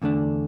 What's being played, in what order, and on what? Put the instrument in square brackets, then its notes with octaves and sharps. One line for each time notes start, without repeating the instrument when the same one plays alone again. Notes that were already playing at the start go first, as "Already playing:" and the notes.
[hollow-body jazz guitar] E2 D3 A3 D4